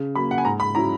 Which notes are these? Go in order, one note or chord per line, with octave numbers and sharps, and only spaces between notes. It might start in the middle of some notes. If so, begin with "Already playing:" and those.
Already playing: C#3
F#3 A#3 B5
F#5
G#5
G#2 A#5
B5
F#3 C#4 E4 A#5